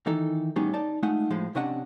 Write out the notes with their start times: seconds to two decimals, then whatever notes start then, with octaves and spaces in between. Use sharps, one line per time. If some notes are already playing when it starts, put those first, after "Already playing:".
0.06 D#3 E3 D#4 A4
0.56 A2 G3 B3 C#4 D#4 G#4
0.74 D#4 D5 A5
1.03 G#3 A3 D#4 F4 F#5
1.30 A2 F3 G#3
1.55 C3 C#4 D4 D#5 F#5